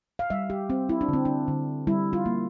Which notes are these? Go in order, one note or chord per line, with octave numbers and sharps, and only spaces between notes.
F5
G3 E5
G4
C4
E4
D4
D3 C4
D4
D3
G3 E4
F4
A#3